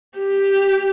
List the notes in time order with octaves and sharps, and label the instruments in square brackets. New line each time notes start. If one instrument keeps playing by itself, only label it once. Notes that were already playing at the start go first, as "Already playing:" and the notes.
[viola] G4